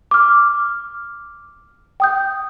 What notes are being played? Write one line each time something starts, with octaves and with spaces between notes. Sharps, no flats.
D6 F6
G5 D#6 G6